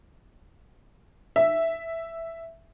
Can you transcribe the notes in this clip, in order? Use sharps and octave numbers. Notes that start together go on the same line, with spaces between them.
E5